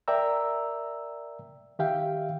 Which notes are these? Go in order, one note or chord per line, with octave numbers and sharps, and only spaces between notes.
A#4 D5 E5 G5 A#5 E6
D#3 G4 E5 F5 G5